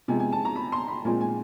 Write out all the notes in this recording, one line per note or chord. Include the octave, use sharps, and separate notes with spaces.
C3 F3 G#3 B3 G#5
G#5
A5
A#5
B5
C6
B5
A#2 F3 G#3 C4 G#5
G#5